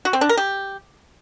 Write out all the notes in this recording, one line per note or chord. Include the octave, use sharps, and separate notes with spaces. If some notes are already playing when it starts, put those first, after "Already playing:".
F#4
C4
D4
A#4
G4